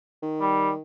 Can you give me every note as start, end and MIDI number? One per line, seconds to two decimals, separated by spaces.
0.22 0.82 51
0.41 0.70 55